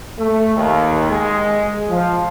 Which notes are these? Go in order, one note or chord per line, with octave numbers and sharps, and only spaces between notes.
A3
D#2
G#3
F3